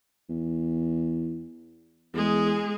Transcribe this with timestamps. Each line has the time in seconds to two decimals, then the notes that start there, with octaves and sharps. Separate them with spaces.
0.29 E2
2.14 E2 G#3 G#4